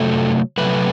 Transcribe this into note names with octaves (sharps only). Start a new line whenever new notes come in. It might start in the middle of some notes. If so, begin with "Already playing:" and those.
Already playing: C3 F#3 A3 A4
C3 F#3 A3 B4